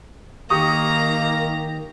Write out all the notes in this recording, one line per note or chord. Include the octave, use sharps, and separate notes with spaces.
D#3 A#3 G4 A#5 C#6 D#6